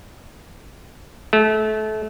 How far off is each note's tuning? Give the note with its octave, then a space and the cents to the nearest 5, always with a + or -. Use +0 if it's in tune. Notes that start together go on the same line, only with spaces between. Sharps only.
A3 -30